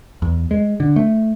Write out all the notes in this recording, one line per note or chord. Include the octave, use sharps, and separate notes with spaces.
E2
G#3
D3
A3